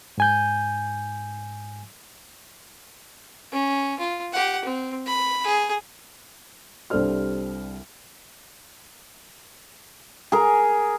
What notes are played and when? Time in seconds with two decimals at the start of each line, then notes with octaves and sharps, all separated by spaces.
0.18 G#2 G#5 G6
3.52 C#4
3.99 F4
4.33 G4 F#5
4.65 C4
5.07 B5
5.44 G#4
6.90 C2 G3 D4 A4 C5 F6
10.32 G#4 A#4